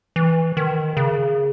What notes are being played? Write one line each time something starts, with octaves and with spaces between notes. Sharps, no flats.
E3
D#3
C#3